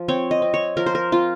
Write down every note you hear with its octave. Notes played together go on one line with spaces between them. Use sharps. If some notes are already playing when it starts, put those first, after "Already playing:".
Already playing: F3
C4 C#5
D#5
C4
C#5
F3 A#4
C5
A#4
C4 F4